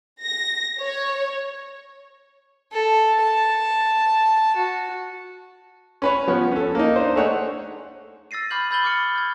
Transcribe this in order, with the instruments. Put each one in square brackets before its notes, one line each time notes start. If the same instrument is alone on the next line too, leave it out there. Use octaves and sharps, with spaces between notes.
[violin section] A#6
C#5
[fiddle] A4
A5
F#4
[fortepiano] C#4 B4 C#5
F3 B3 C#5
C#4 A4
A#3 D#4
D4 C5
A3 D#4 G#4 C#5 F#5
[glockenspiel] E6 A6 A#6 C7 D#7
B5 C#6 D6 F6 G6 F#7
B5 E6 G6 A6 F#7 G7
C#6 D6 F6 C#7
G6 G#6